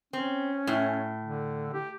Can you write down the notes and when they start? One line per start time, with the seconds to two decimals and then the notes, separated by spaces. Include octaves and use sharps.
0.13 C4 C#4
0.67 A2
1.22 D3
1.73 G4